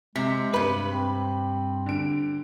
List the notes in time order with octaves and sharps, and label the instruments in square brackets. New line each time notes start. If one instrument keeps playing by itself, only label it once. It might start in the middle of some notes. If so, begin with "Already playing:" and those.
[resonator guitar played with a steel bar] C3 [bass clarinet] G#3 [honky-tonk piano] B6
[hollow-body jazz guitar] G2 B4 [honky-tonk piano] B5
[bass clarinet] C4
[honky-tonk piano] D3 D7